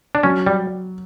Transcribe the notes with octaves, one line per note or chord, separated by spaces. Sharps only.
D4
F#3 C#4
G3